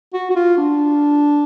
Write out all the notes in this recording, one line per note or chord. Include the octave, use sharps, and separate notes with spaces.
F#4
F#4
F4
D4